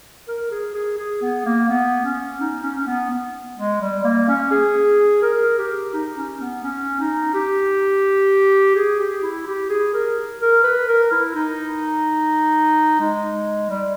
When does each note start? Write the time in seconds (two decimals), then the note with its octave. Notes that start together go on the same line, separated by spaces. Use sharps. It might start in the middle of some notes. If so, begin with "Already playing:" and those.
0.28 A#4
0.51 G#4
0.75 G#4
0.98 G#4
1.22 B3
1.45 A#3
1.69 B3
2.05 C#4
2.40 D#4
2.63 C#4
2.78 C#4
2.87 B3
3.10 B3
3.58 G#3
3.81 G3
4.04 A#3
4.28 C#4
4.51 G#4
5.22 A#4
5.58 G4
5.94 D#4
6.17 C#4
6.41 B3
6.63 C#4
7.00 D#4
7.34 G4
8.75 G#4
9.00 G4
9.23 E4
9.47 G4
9.70 G#4
9.94 A#4
10.41 A#4
10.64 B4
10.88 A#4
11.12 E4
11.35 D#4
13.00 G#3
13.70 G3